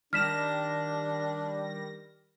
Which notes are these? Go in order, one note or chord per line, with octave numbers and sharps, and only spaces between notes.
D#3 G3 D4 F6 A#6 B6 E7